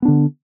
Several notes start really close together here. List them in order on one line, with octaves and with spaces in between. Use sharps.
B3 D4 D3